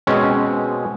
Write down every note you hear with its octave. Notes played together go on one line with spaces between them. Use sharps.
B2 G#3 C4 C#4